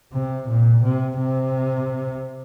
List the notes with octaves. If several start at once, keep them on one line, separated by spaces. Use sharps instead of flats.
C3
A#2
C3
C3